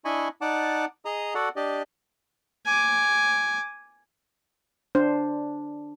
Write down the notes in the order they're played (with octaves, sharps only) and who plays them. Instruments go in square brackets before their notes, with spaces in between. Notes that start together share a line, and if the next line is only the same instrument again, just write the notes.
[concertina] D4 E4 D#5 G#5 B5 C#6
D#4 D5 F#5 A5 D6
G#4 D#5 A#5 D#6
F#4 A4 D5 F#5
D4 G4 D5 D#5
[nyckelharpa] G#5 D6
[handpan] D4 [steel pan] C5